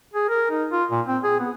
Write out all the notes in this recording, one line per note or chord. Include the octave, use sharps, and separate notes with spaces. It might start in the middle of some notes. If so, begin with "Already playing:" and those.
G#4
A#4
D#4
F4
A#2
C4
G#4
B3